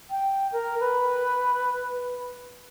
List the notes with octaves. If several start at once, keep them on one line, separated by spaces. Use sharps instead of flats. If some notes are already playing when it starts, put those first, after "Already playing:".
G5
A#4
B4